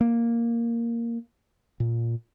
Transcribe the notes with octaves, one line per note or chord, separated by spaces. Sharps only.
A#3
A#2